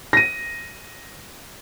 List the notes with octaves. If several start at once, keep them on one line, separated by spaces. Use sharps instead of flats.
A#6 D#7